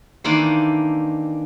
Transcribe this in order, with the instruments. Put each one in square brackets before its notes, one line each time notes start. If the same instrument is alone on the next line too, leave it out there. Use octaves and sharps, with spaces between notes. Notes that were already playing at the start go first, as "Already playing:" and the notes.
[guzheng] D#3 E3 A#3 D4 A4 C5